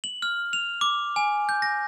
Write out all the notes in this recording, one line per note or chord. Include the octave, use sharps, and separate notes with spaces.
F#7
F6
F7
D6
G#5
G6
A#6